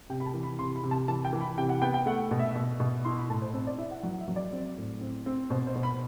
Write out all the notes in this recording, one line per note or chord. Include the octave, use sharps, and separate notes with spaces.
C3 G5
B5
A5
E3
B5
C3 C6
B5
C3
A5
E3 A5
G5
E3
B5
C3 G5
F#5
B3 G5
G5
A3 F#5
B2
E5
B2
B2
E4 C6
B5
A2 A5
C5
C4 C5
D5
E4 E5
F#5
F#3 F#5
E5
F#3
D5
C4
A2
C4
C4
B2 C5
C5
B2
B5